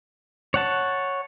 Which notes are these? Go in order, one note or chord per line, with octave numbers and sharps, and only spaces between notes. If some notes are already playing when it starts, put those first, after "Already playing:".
C#5 F#5 A5